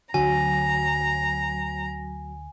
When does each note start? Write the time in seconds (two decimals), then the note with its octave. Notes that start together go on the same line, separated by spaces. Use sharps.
0.14 D2 D3 F#3 G#5 A#5